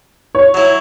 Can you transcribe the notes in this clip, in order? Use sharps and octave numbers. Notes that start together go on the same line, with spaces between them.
C#5
F#3 E4